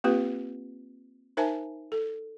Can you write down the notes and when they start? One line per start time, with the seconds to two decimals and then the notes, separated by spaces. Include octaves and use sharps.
0.04 A#3 C4 F4 G4 B4
1.37 D#4 A#4 C5 E5 G#5 A5
1.92 A4